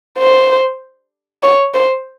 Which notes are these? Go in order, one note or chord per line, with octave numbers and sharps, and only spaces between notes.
C5
C#5
C5